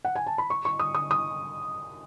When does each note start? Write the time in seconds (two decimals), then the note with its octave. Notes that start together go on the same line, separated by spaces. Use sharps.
0.05 F#5
0.15 G#5
0.27 A5
0.38 B5
0.50 C#6
0.65 C#6
0.80 D#6
0.95 D#6
1.11 D#6